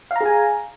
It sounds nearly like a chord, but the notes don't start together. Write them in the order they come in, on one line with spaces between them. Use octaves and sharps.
F5 A#5 G#4 G#5